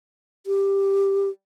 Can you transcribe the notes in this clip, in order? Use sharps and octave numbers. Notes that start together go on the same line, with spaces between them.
G4